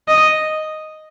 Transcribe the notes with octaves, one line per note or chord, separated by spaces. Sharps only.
D#5